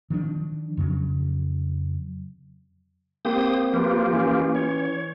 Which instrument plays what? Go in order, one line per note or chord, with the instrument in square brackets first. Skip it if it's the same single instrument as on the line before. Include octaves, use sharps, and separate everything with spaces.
[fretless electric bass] D#3 F3 D4
F2 C#3 F#3
[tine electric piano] A#3 C4 [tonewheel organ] G4 C5 D#6
[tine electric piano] F3 B4 [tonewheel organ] A#3 F4 G4
[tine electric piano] E3 C#4
[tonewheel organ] C#5